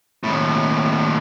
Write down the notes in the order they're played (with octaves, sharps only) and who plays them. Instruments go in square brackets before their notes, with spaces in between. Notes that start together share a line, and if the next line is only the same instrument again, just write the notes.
[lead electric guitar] D#2 A2